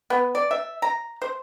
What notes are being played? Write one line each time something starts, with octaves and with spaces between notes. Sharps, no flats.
B3
D5
E5
A#5
C5